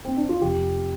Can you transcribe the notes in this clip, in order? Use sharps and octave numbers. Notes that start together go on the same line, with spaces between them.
C4
D4
F4
F1 G4